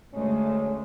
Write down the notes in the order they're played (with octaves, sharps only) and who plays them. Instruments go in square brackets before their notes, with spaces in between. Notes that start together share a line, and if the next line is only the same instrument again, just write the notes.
[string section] D2 A3 [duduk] G#3 [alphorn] C#4